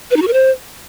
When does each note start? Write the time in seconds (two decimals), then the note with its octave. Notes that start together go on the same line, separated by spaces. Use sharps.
0.11 B4
0.16 D#4
0.22 F#4
0.28 A#4
0.33 C5